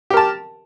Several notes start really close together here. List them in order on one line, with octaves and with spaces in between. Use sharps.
G4 A#4 A5